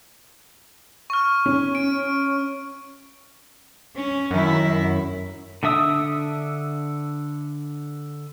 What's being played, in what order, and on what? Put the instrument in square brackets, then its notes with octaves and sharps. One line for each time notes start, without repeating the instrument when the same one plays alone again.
[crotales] C#6 F6
[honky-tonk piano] C#4
[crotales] D7
[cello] C#4
[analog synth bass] F#2 [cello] D#3 E4
[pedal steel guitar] D3 D4 E5 D#6 E6